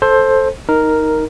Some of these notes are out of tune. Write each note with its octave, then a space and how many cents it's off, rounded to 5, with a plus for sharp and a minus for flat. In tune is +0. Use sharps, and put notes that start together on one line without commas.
A4 +0 C5 +15
D#4 +5 A#4 +0